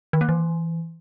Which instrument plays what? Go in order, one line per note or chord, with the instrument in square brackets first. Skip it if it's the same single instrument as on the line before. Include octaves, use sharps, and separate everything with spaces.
[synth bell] D#3
A#3
E3